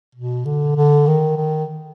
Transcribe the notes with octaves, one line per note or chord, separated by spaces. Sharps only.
B2
D3
D3
D#3
D#3